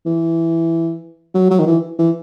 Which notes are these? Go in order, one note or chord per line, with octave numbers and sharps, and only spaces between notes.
E3
F#3
F#3
D#3
E3
E3